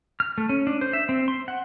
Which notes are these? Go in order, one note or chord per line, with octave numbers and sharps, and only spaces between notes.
F6
A3
C#4
D4
C5
E5
C4
C6
F#5